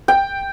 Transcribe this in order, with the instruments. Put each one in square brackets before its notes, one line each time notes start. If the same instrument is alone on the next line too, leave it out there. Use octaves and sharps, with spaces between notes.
[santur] G5